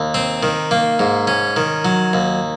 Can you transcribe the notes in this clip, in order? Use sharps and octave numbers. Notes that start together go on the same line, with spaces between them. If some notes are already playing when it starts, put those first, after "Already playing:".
Already playing: D#2
C4
D#3
A#3
G#2
C#4
D#3
F#3
D#2